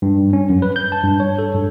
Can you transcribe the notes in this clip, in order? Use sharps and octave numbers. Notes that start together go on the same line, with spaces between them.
G2
C#4
F#2
B4
G6
A5
G2
C#5
A4
G2